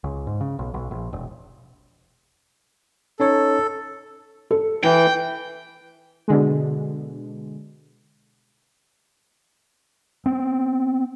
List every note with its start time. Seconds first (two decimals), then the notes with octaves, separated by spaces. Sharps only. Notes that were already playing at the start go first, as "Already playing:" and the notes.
0.04 C#2
0.27 G#2
0.41 C#3
0.59 B1
0.74 B1
0.91 A#1
1.13 E1
3.20 C#4 D#4 A4 C#5
4.51 A4
4.83 E3 E4 G5
6.28 B2 D3 G#3
10.26 B3 C4